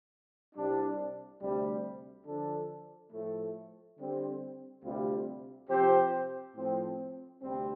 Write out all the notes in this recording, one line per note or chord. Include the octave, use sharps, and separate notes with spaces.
C2 C3 G3 D4
D2 C3 G3
D3 F3 D4 A4
A2 F3 A3
D3 G3 C4
D2 C3 G3 C4 F4
C3 F3 C4 G4 C5
A2 F3 C4
D2 C3 G3 C4